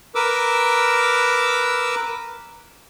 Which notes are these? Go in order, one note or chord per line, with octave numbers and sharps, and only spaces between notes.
A#4 B4 D6 E6